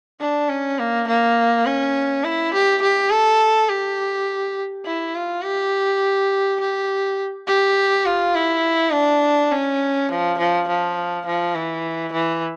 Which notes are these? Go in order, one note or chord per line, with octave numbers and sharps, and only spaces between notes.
D4
C#4
A#3
A#3
C#4
E4
G4
G4
A4
G4
E4
F4
G4
G4
G4
F4
E4
D4
C#4
F3
F3
F3
F3
E3
E3